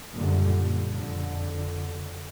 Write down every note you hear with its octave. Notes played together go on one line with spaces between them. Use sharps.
F#2 A#2 D3 G3
F2 D3